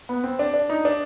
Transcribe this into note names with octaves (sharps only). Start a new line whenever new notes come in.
B3
C4
D4
D4
D#4
D4